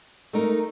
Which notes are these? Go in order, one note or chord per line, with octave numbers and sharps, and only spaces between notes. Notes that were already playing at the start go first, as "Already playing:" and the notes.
A3 D#4 A#4